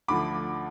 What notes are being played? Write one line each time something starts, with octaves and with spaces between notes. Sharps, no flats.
D2 D3 F3 B5 D6